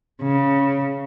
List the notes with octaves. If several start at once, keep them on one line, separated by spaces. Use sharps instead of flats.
C#3